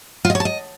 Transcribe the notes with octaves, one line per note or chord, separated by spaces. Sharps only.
F4
D#5
C#5
A5
D#5